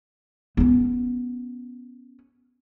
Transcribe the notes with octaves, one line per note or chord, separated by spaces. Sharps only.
B3 C#4